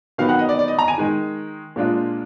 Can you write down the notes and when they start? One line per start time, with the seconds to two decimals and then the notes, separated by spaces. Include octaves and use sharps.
0.18 D#3 F#3 B3 D#4 F5
0.29 F#5
0.39 D#5
0.49 D5
0.59 D5
0.68 D#5
0.79 A#5
0.88 G#5
0.98 D#3 G#3 D#4
1.76 A#2 G#3 D4 F4